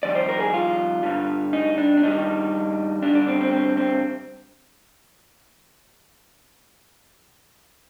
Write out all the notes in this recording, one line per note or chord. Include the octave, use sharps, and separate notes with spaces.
F2 D#3 G3 D5
C5
A#4
G#4
F4
G2 D3 G3
D#4
D4
D4
G2 D#3 G3 D#4
G2 D3 G3 D4
D4
C4
C4
C4
C4